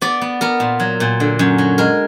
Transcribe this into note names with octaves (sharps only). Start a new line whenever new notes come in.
B3 D5
B3
B3 A#4
A#2
F#3
A#2
D3
F#2
F#3
G#3 A#4